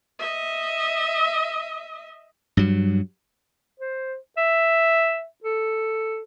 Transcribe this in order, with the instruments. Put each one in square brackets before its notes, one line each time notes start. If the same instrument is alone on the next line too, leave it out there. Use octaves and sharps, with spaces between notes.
[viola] D#5 E5
[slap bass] G2 F#3
[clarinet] C5
E5
A4